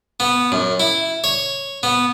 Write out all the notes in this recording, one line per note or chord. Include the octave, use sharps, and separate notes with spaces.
B3
F#2
E4
C#5
B3